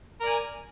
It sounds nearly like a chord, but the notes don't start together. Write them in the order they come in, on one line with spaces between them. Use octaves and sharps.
A#4 D5 G#5